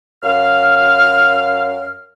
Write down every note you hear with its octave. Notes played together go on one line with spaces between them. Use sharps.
F#2 F5 F6